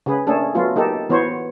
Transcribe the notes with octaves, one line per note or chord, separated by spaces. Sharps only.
C#3 G#4 B4
A3 A#3 C#4 D4 G#4 A4
F#3 A3 B3 F4 F#4
A#3 D#4 G4 A4
E3 B3 F#4 C5 C#5